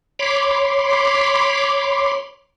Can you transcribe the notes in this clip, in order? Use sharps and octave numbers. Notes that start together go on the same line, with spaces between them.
C#5 B5 C6 D6